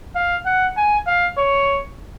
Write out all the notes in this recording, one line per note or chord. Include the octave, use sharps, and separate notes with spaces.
F5
F#5
G#5
F5
C#5